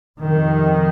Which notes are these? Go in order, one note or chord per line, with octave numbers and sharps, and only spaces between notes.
F2 C3 D#3